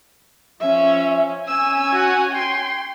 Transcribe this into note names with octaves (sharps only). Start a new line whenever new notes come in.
F3 C#4 E5
C#4 G#5 E6
F#4 F#5
G5 C6